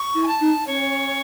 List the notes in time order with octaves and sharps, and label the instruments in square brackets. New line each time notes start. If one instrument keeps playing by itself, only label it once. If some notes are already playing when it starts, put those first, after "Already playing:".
Already playing: [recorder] C#6
[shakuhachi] E4
[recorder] G#5
A5
[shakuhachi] D#4
[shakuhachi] C#4 [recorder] C#5